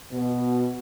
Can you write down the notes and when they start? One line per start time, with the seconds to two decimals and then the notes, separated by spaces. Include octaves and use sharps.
0.12 B2